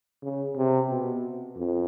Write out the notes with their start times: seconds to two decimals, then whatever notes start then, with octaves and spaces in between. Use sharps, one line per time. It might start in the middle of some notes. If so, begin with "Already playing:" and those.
0.23 C#3
0.56 C3
0.89 B2
1.56 F2